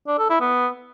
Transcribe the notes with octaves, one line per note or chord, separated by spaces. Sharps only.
D4
A4
E4
B3